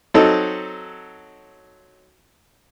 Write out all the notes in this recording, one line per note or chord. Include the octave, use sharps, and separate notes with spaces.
F#3 C4 D#4 A4